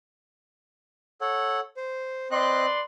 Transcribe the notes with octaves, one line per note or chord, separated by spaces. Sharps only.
A4 C#5 F#5
C5
C4 B4 D5 D#5 C6 F#6